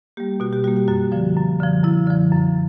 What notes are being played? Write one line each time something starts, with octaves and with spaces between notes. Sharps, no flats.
G3 A#3 G4
B2 F#4
G4
G3 A#3 F#4
G4
F#2 F#4
D3 F3
F#2
D3 F3
F#2 E4
D3 F3
F#2